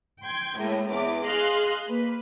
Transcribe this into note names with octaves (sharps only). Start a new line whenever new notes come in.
G5 C6 G#6
A2 G#3 A#3
E2 D6
G#4 D#5 F5 C6 F#6
A#3 B4